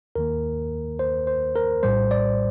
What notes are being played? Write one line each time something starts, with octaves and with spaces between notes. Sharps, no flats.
D#2 D#3 A#3 A#4
C5
C5
A#4
A#1 A2 G3 C5
D5